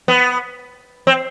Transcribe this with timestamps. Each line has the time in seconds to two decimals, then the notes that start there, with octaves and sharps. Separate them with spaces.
0.08 B3
1.07 C4